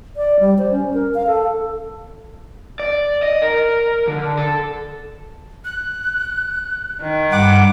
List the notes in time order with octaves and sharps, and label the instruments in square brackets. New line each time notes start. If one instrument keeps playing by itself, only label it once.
[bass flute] D5
G3
C5
C#4
A#4
F5
A4
[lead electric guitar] D5
D#5
A#4
D3
A4
[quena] F#6
[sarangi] D#3
[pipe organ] G2 D6 [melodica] F#5 [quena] B5